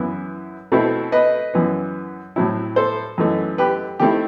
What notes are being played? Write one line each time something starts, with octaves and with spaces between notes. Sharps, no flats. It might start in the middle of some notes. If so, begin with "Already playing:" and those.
Already playing: F#2 E3 B3 E4
B2 A3 C4 E4
B4 D#5
F#2 E3 B3
A2 F#3 C4 E4
A4 C5
F#2 E3 A3 D#4
G4 B4
D#3 A3 C4 E4 G4